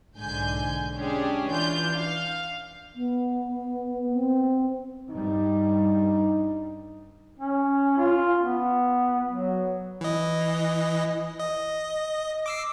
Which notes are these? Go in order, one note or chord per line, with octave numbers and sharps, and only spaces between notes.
B1 G#2 D3 G#5 G6
G#3 C#4 D4 G4 G#4
E3 D4 F4 G6
F5
B3
C4
G2 G3 D#4
C#4
F4
B3
F#3
E3 D#5
D#5
D6 E6 C7